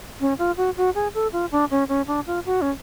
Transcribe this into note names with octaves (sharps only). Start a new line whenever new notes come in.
C#4
F4
F#4
F#4
G#4
A4
F4
D4
C#4
C#4
D4
F4
F#4
C#4